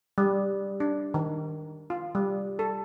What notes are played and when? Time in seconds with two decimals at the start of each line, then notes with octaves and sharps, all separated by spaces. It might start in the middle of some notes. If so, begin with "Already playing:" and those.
0.18 G3
0.80 D4
1.14 D#3
1.90 F4
2.15 G3
2.59 A4